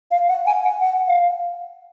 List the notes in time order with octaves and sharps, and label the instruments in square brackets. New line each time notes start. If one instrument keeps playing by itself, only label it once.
[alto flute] F5
F#5
G#5
F#5
F#5
F5